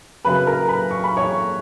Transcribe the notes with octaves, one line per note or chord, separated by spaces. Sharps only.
F#2 C#3 F#3 B4 B5
A#4 A#5
B4 B5
C#6
B5
C#5 C#6